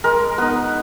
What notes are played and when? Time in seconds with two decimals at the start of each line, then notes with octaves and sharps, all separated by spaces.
0.04 G#3 A#4
0.38 B3 D#4 B4